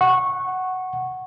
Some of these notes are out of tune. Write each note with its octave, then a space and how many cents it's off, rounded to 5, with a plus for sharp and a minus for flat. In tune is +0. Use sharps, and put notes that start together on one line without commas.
F#5 +5 C#6 -15